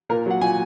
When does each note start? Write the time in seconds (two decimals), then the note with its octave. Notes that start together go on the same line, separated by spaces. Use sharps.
0.09 A#2 A#4
0.26 F#3 F#5
0.41 A#2 G#5